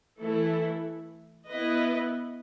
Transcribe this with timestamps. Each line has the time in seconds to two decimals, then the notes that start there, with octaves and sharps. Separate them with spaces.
0.20 E3 A3 E4 A4
1.48 B3 E4 B4 D#5